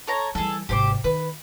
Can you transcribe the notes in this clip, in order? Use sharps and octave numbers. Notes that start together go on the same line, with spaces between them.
A4 C#5 A#5
E3 G3 G#4 A4
G#1 C3 G4 C5 D6
D#3 B4